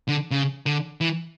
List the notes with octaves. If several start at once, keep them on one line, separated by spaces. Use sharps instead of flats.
D3
C#3
D3
E3